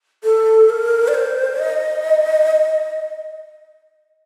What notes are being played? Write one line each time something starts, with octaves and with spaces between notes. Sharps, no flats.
A4
A#4
D5
C5
D#5